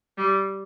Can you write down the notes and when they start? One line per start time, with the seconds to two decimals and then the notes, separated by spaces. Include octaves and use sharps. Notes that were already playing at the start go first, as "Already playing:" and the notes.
0.18 G3